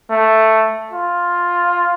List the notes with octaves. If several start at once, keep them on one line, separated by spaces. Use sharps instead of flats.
A3
F4